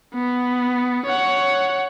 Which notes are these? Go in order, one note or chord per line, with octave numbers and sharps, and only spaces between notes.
B3
C#5 F#5